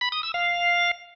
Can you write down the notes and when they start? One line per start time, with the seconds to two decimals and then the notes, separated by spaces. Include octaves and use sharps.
0.01 B5
0.12 D#6
0.23 E6
0.34 F5